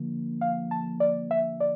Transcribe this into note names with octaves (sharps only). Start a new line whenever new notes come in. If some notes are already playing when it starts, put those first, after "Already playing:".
Already playing: D3 F3 A#3
F5
A5
D5
E5
D5